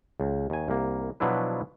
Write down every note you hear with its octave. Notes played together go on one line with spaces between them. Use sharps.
C#2
D#2 G#5
C2 A#3
B2 F3 F#3 D4 E4 B4